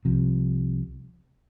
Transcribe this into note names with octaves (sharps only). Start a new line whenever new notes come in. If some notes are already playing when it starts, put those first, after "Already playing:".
C2 C3 F3